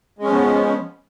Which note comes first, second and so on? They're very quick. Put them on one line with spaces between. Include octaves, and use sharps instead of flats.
G#3 C#4 F3 B3